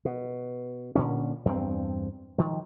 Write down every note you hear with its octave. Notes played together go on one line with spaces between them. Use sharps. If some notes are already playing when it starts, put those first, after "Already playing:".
B2
A#2 D3 C#4
E2 G2 C4
D#3 F3